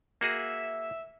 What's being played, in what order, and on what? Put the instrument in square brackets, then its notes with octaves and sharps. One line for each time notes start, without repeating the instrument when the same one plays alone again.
[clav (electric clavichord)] A#3 F#4 G#4 [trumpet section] E5